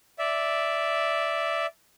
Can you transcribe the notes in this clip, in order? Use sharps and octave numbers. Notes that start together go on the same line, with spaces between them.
D5 E5